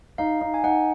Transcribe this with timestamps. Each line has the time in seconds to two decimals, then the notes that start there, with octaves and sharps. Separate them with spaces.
0.18 D#4 F5
0.41 D#4
0.54 G#5
0.64 D#4 F#5